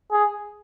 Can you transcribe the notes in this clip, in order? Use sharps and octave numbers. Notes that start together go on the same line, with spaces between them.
G#4